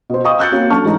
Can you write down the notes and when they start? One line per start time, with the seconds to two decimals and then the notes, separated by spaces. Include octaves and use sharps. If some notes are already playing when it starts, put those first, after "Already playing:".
0.10 B2 C5
0.24 D#5 F5 G5 B5 C#6 D#6
0.39 E6 F#6 G6 A6 C#7
0.51 A#3 C4 F#4 C#5 F5
0.70 F#3 D4 A4 A5 C#6 F6
0.84 A1 G#2 D#4 A#5